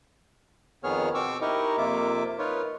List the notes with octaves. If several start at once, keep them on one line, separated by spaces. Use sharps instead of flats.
F2 D#3 B3 G#4 C#5 F6
B2 C4 C#6 D6 E6
D#4 E4 G4 A#4 D#5 C#6
F2 C3 A#3 F4 E5 D6
D#4 F4 A#4 B4 C#5